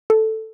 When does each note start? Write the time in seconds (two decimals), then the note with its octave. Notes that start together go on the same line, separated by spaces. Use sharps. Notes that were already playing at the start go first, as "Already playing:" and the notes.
0.10 A4